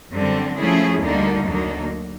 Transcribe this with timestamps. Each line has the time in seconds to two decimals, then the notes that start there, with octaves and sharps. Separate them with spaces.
0.14 F#2 D3 G3 C4
0.59 F3 A3 C#4 E4 G#4
1.02 D2 D3 G3 A#3 D#4
1.46 D2 D3 F#3 A#3 D#4